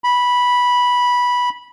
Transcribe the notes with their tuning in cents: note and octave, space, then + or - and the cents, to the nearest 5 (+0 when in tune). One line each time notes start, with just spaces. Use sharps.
B5 -10